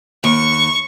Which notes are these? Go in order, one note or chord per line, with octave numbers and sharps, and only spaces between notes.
D#2 C#6